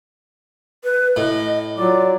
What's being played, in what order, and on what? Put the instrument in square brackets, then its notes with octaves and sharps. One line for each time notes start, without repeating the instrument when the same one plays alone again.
[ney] B4
[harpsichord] A2 [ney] D#5
[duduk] F#3 [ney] F4 [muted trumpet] D5